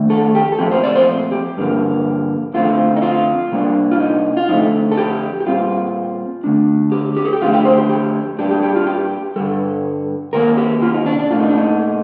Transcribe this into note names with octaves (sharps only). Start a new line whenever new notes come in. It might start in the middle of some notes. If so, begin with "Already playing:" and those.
Already playing: F2 D#3 A3 D4
A4
G4
A4
A#2 F3 A3 C4 G4
C5
D5
C5
G4
G2 D3 F3 A#3
F2 D3 F3 A3 C4 F4
D#4
F4
C3 G3 A#3 D4
F4
D#4
F4
F2 D3 A3 D#4
A4
G4
G4
A#2 G3 C4 F4
D3 A3 D4
G4
G4
A4
G4
F2 D3 A3 F4
G4
C5
G4
G4
A#2 G3 D4 G4
G4
G4
F4
G4
G2 D3 G3 A4
C3 D#3 A#3 A#4
G4
F4
D#4
D4
D4
A#2 A3 D4 F4
D#4
D4
D#4